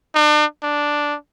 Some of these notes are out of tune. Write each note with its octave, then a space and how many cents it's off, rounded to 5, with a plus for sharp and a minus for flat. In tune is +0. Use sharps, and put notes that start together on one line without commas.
D4 +40
D4 -5